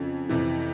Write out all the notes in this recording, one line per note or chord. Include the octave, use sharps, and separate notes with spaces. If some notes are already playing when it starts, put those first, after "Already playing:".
Already playing: F2 C#3 F3
F2 C3 E3